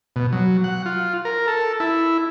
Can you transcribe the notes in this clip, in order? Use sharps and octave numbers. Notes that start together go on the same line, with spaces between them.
B2
F#3
F#5
F4
A#4
A4
E4